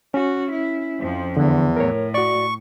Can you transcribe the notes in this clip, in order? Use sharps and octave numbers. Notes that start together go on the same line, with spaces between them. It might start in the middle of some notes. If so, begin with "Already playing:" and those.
C#4 F#4
E4
F2 F3
E2 D3
A2 A#4 C#5
F#4 D5 C#6